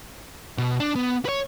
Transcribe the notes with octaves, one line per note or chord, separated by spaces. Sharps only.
B2
D4
B3
B4 C#5